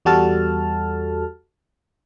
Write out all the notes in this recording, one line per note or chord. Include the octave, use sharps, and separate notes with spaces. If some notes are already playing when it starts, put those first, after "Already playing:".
E2 G3 F#4 A4 A5 F6